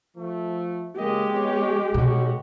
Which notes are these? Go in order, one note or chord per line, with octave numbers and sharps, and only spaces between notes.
F3 A3
C#2 G#3 A#3 G4 D#5
B3 C#5
B1 B2 F#4